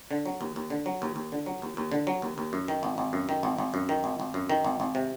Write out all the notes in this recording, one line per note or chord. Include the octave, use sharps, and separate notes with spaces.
D3
F#3
D#2
D#2
D3
F#3
D#2
D#2
D3
F#3
D#2
D#2
D3
F#3
D#2
D#2
F#2
D#3
G#1
G#1
F#2
D#3
G#1
G#1
F#2
D#3
G#1
G#1
F#2
D#3
G#1
G#1
C3